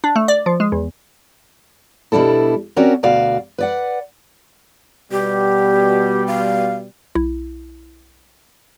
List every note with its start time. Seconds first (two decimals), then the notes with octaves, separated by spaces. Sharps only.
0.04 D4
0.16 A3
0.28 D5
0.46 F3
0.60 G#3
0.72 E2
2.12 B2 G3 D4 E4 A4
2.76 C4 C#4 F#4 A#4 D5
3.03 D2 B2 F#4 D5 F5
3.58 B4 D5 F#5
5.12 B2 G3 G4
6.27 F5
7.15 B1 E4